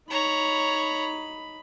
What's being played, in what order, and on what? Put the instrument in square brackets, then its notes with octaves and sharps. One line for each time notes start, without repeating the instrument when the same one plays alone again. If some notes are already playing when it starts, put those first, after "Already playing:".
[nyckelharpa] D#4 B5 [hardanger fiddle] C#5 A#5